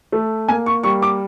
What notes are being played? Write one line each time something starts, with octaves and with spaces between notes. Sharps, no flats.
A3
A#3 G#5
C#6
G3 C#6
D6